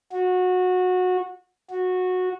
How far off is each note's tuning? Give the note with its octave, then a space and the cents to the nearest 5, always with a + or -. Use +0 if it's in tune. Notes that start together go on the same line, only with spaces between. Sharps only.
F#4 -20
F#4 -15